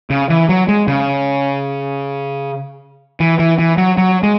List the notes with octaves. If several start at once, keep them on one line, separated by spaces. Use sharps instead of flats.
C#3
E3
F#3
G#3
C#3
E3
E3
E3
F#3
F#3
G#3